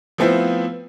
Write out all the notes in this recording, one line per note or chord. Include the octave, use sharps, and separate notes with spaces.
F3 A3 B3 C4 E4 F4